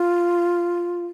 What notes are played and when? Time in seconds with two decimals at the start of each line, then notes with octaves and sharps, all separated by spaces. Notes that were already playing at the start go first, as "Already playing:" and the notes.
Already playing: F4